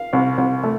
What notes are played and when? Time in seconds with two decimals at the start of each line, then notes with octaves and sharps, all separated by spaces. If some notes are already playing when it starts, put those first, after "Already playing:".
Already playing: F5
0.13 C2
0.38 C2
0.63 A3